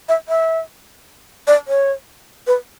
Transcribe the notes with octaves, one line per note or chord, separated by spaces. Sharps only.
E5
E5
D5
C#5
B4